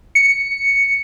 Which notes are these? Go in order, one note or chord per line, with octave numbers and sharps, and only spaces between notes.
C#7